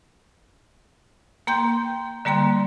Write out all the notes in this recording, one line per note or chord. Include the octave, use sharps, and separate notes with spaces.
A#3 G5 C6 G6
D3 G3 A#3 G5 C6